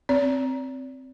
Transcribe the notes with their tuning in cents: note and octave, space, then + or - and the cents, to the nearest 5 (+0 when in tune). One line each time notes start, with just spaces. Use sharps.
C4 +0 D5 -40